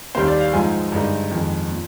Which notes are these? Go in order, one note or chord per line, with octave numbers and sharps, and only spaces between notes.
D#2 D#3 G3 A#3 C5
D5
F5
G#2 F3 G#3 D#4 G#5
G2 D3 G#3 D#4
F2 D#3 G#3
A#2